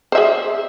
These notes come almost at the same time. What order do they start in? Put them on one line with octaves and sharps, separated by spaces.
C5 E5 G#4